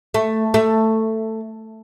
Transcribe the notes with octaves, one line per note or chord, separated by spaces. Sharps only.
A3
A3